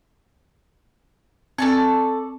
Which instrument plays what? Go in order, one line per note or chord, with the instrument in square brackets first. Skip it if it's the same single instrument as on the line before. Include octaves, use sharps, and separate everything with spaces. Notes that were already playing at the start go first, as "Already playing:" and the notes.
[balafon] C4 G#5 [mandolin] A4 D5 C#6